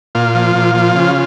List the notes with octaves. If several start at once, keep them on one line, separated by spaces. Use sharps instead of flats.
A#2 F4
F3
A#2
F3
C#3